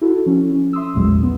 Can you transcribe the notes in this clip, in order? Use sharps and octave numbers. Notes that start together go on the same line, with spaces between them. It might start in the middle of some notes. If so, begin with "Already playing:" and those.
E4 F#4 A4
F3 C#4
E5 C6 D#6 E6
A1 E2 A#2 F#3 G#3
B1
B3